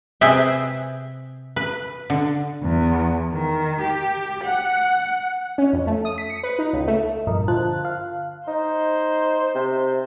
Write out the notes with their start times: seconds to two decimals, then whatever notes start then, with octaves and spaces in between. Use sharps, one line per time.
0.21 C3 G#4 B4 E5 G5
1.56 B4
2.10 D3
2.62 E2
3.32 D#3
3.81 G4
4.44 F#5
5.58 C#4
5.73 F2
5.87 A3
6.05 D#6
6.18 B6
6.30 C#7
6.43 B4
6.59 D#4
6.73 C#2
6.88 A3
7.27 G2 A#2 F3 A#4 D#5
7.48 D3 F4 C5 A5 F#6
7.85 F5
8.48 D#4 C5
9.55 C3